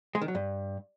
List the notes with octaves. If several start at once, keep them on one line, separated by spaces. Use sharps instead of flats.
G#3
D#3
F#3
G2